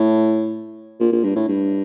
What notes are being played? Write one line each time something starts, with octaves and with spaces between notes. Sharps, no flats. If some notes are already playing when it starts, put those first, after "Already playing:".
Already playing: A2
A#2
A#2
G2
A2
G2